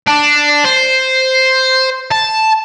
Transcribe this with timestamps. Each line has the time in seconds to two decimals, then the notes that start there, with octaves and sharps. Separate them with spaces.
0.07 D4
0.65 C5
2.11 A5